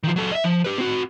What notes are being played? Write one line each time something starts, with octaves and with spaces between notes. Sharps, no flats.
D#3 F3
F#3 A4
D#5 E5
F3
G4 B4
C4 F#4